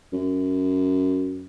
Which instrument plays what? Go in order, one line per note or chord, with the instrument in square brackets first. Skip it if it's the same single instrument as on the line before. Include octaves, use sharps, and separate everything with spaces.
[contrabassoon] F#2